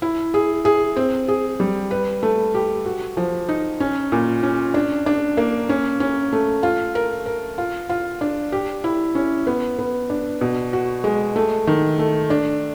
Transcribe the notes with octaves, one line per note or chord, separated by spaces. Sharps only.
E4
G#4
G#4
C4
G#4
G3
B4
A3
G4
F#4
F3
D#4
C#4
A#2
C#4
D4
D4
A#3
C#4
C#4
A3
F4
A#4
A#4
F4
F4
D4
G4
E4
C#4
B3
B3
D4
B2
F#4
G#3
A3
D#3
A3
D4